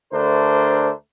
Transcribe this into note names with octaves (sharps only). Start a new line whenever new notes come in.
D2 D3 A3 D4 A#4 C5